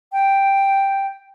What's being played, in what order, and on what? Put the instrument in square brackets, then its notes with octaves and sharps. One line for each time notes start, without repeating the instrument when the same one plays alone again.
[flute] G5